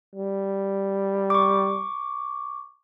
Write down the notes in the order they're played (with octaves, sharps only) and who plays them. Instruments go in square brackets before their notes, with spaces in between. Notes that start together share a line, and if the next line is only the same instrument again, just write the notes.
[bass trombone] G3
[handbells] C#6 D6